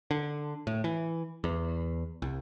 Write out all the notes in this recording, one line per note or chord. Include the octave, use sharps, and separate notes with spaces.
D3
A2
E3
E2
C2